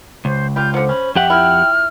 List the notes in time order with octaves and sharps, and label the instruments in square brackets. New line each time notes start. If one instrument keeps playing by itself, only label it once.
[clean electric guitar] C#2 [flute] C5
[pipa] G3 F4 [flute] G6
[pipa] D3 F3 [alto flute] C5 [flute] F#5
[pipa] C#4 [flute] B5
[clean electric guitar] F2 G4 F#5 [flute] E5 [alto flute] G5
[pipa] F3 E4 [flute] F6